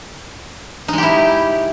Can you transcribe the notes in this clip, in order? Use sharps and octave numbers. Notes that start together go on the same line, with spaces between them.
G#3 D#4 E4 G4